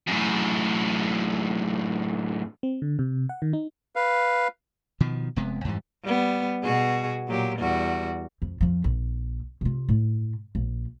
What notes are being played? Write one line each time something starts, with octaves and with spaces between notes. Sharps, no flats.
F#2 A2
C4
D3
C3
F#5
D#3
D#4
B4 F5
B2 D#3 F3
F1 C3 G#3 B3
F2 G#2 E3 G3
G3 B3
B2 F#4 G#4
A#2 F#3 G4
E2 G3 F#4
F2
F2 F3
A#1
C3 F4
A2
A#1